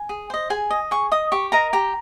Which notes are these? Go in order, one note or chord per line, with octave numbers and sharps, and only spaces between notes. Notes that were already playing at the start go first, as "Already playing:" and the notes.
Already playing: G#5
G#4
C5 D#5
G#4 G#5
D#5
G#4 C#6
D#5 D#6
G4 C#6
A#4 D#5 A#5
G4 A#5